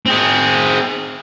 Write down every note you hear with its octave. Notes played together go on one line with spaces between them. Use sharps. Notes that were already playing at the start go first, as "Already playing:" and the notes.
C4 G#4